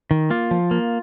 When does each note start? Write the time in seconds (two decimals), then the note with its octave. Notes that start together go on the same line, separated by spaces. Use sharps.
0.11 D#3
0.30 A#3 F4
0.51 F3
0.71 A#3